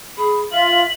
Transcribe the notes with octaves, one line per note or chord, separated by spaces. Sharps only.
G#4 B5
F4 E5 F#7